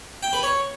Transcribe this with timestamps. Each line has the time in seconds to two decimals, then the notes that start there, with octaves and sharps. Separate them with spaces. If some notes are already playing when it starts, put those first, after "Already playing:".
0.23 G5
0.33 B4
0.43 C#5